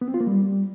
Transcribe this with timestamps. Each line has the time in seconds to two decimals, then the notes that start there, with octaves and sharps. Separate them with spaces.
0.01 B3
0.08 C4
0.14 F4
0.20 A#3
0.27 G3